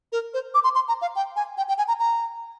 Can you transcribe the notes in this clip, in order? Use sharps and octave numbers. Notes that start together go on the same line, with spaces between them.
A#4
C5
D6
C6
C6
A#5
F5
G5
G#5
G5
G5
G#5
A#5
A#5